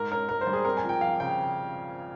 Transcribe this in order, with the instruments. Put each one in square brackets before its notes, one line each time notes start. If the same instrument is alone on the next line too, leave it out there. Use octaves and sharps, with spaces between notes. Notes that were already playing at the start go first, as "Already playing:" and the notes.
Already playing: [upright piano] G#2 A#4
C#4 A#4
G#2 A#4
C5
G3
G#4
C4 A#4
G#5
F3
G5
F2 F5
C#3 G5